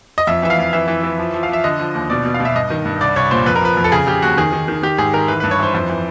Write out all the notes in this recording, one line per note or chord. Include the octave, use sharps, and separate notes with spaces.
D#5
F2 E5
E3 E5
F5
F2
E3 E5
E3
E3
F3
F3
F5
F3 E5
D3 D#5
F3
D#2
B2 D5
B2
F5
B2
E5
G2 D#5
D#3
G2
C2 D5
C2 C#5
A#2 C5
F2 B4
A#4
F3 B4
F2
A4
C#3 G#4
C#3 G4
D#2 F#4
D#3 G#4
D#3
D#3
D#3 G4
G#2 G#4
D#3 A#4
E3 B4
G2 B4
C#5
E3 C5
F2 C5
E3